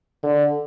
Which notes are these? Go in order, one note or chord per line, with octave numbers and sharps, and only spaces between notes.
D3